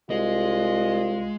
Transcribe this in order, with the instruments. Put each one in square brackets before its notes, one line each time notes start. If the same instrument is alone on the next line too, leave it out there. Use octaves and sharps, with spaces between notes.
[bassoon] C2 [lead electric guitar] G#3 [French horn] F4 [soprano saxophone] D#5